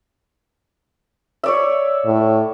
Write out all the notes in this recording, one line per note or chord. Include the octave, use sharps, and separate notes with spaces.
C#5 D5 E5
A2